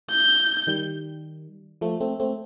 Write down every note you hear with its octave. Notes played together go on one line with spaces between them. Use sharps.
G6
D#3 G3
F3 A3
A3 C4
A3 C4